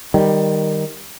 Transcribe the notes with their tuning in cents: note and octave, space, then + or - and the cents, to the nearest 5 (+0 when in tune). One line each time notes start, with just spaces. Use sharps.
D#3 -5 G3 +10